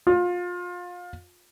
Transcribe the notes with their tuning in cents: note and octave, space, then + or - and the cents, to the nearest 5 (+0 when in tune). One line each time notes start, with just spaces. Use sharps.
F4 +25